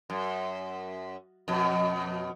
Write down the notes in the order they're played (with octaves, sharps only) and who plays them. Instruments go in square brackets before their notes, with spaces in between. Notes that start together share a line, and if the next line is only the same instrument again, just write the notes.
[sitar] F#2
F2 B2